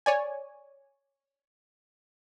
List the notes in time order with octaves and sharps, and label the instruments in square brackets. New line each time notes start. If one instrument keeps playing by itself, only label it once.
[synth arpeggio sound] C#5 D5 G#5